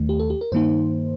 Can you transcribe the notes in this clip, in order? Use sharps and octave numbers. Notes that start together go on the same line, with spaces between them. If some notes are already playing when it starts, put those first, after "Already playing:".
Already playing: D#2 D#3 A3
G4
A4
G4
A#4
G2 D#3 A#3 D#4 C5